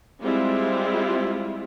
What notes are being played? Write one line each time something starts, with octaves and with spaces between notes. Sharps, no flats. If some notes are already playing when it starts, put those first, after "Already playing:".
G3 G#3 C4 E4 F4